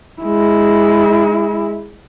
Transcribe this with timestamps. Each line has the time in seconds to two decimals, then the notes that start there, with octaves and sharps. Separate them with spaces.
0.22 G#3 E4